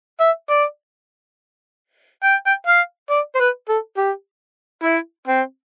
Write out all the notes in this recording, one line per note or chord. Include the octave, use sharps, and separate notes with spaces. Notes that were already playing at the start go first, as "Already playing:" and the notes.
E5
D5
G5
G5
F5
D5
C5
B4
A4
G4
E4
C4